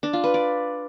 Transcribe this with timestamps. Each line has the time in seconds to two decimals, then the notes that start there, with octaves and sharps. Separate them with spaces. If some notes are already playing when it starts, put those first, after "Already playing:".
0.03 D4
0.13 F4
0.24 B4
0.34 D5